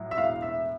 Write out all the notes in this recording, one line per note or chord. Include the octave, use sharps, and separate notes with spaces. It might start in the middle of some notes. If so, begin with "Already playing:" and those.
Already playing: A2 F#3
E5
E1 F5
E5